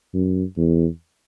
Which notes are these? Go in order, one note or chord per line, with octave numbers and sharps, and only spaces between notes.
F#2
E2